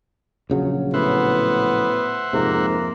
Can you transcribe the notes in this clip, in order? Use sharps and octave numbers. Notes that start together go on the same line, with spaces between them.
A#1 C#3 F#3
A2 B3 C5 E5 F#5
F2 G#2 C3 A#3